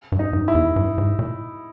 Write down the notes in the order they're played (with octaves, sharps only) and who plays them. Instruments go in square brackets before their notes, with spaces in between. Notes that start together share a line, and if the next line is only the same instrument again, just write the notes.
[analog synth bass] G2
[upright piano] D#4
[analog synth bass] G2
[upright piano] E4
[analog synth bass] E2
G2
G#2
A#2